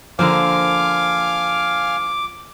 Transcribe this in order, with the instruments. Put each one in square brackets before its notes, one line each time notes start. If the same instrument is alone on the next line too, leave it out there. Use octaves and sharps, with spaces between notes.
[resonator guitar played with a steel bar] D3 A#3 C5 [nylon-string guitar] F3 [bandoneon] F5 G#5 F6 [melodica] D6